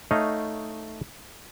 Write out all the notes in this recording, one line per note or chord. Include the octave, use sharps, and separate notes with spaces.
A3 D#4 C#5 D#5 F5